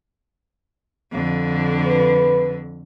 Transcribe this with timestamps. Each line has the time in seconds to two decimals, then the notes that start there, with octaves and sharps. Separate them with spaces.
1.12 F2 D3
1.87 B4